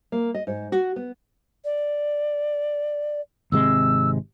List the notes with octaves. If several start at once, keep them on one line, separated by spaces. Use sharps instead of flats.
A#3
D#5
G#2
F#4
B3
D5
G#1 C3 G#3 E6